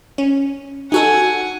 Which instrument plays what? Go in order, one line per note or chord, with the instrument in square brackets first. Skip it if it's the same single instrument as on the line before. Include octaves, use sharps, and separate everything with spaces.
[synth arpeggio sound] C#4
[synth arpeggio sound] D#4 F#4 A4 [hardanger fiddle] F#5 G#5